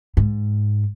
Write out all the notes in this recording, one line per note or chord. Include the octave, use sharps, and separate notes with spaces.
G#2